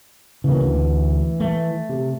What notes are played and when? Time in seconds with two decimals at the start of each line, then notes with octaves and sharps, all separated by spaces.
0.44 C#3 E3 A#3
0.61 D2
1.40 A3
1.89 C3